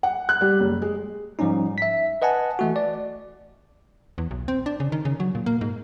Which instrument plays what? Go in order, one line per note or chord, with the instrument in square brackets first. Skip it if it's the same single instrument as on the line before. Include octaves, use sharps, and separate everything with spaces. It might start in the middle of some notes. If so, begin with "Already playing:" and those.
[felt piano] F#5
F#6
G3
F#1
G#3
[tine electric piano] G#2 F3 G3 C#4 D#4
E5 B6
B4 D#5 F#5 G#5 A5
E3 A3 F#4
D5
[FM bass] E2
B1
C4
D4
C#3
D#3
C#3
F#3
A#2
A#3
G#2